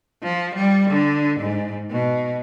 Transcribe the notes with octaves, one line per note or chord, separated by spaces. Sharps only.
F3
G3
D3
G#2
B2